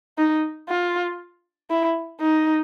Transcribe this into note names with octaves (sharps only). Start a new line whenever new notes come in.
D#4
F4
E4
D#4